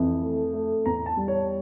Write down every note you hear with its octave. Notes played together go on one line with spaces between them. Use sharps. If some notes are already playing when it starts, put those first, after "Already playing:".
Already playing: F2 E3
A3
A3
E2 A#5
A5
G3
C#5